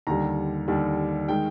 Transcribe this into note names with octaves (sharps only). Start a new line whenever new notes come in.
D#2 D3 G3 A#5
D#2 D3 G3
D#3 G#3 G5